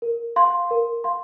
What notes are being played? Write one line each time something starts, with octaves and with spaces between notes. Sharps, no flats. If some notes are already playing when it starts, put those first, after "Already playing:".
A#4
F5 C6
A#4
F5 C6